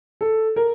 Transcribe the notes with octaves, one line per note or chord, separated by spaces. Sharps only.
A4
A#4